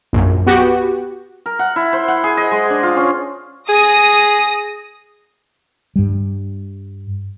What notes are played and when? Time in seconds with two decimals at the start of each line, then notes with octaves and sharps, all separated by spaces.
0.13 A#1 F#2
0.47 B3 F#4 G4
1.46 A#4
1.59 F#5
1.76 E4
1.93 C5
2.08 F#5
2.24 G#4
2.37 D#5
2.51 G#3
2.70 D4
2.83 F4
2.96 C#4
3.69 G#4 D#6 A#6
5.96 G2 G3